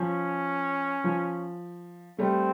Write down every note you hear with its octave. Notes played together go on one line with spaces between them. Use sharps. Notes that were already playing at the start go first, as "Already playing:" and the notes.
Already playing: F3 C#4
F3
G3 A3 C4